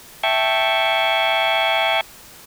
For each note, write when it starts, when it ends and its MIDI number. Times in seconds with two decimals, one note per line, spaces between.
0.23 2.01 76
0.23 2.01 79
0.23 2.01 81
0.23 2.01 85